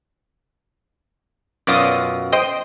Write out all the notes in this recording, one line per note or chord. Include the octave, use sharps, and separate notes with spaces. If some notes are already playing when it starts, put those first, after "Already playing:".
F#2 B2 F4 D5 D#6
C5 D#5 G5